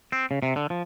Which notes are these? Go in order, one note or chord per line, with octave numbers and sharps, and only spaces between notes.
C4
C#3
C3
D3
F3